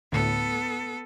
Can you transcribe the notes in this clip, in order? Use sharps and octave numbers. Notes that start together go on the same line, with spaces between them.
D2 A2 B3 A4